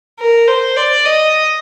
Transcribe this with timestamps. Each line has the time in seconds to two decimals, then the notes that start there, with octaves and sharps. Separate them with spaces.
0.19 A#4
0.48 C5
0.77 D5
1.05 D#5